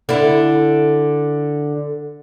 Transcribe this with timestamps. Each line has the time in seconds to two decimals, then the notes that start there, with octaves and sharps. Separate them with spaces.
0.09 D3 E4